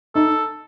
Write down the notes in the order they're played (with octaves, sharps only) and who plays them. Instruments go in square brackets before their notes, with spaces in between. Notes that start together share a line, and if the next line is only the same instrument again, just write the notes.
[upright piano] D#4 [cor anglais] A4